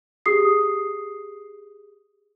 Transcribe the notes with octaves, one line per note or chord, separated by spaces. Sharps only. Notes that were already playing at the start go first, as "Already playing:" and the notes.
G4 G#4 D#6 C7